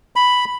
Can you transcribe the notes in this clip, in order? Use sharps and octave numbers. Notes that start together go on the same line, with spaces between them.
B5